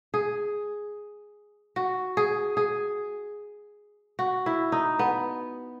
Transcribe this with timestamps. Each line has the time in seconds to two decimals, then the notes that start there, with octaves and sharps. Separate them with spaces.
0.14 G#4
1.76 F#4
2.17 G#4
2.57 G#4
4.19 F#4
4.46 E4
4.72 D#4
4.99 B3